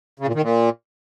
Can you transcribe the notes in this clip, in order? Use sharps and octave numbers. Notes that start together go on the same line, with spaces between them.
C#3
A#2
D#3
A#2